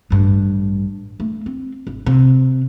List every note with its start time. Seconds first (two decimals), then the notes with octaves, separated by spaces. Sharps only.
0.10 A1 G2
1.20 A3
1.46 C4
1.87 G#1
2.06 C3